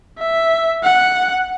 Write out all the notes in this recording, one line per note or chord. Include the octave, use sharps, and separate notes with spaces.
E5
F#5